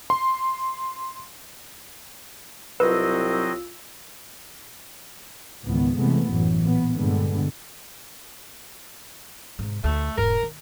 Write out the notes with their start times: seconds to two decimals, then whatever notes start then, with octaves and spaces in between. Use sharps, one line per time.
0.10 C6
2.80 C2 F#3 C4 F4 B4 D#5 E6
5.64 C#2 G#2 D#3 E3 B3
5.96 C3 E3 G#3 A3 B3
6.28 A1 F#2 E3 F#3
6.63 A#2 B3
6.94 G2 A#2 D3 G3 G#3 B3
9.59 G#2 C3
9.84 D2 A3
10.18 E1 G#2 A#4
10.42 D#3